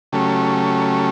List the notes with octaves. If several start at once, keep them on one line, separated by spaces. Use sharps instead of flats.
C#3 F#3 A3 C#4 G4 A4